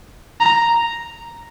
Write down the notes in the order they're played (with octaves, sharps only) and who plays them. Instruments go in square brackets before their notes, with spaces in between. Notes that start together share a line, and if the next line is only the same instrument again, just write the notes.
[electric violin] A#5